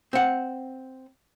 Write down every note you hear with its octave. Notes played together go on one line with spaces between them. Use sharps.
C4 F#5